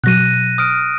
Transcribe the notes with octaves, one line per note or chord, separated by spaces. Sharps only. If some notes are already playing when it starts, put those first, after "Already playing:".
B2 F#3 F#6 A#6 D#7
D#6 F6 D7